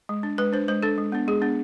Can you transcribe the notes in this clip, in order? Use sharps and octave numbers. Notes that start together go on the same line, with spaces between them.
G#3
D4
G#3 B4
D4 C5
G#3 C5
D4 A4
G#3
B3 D4
G#3 G#4
B3 D4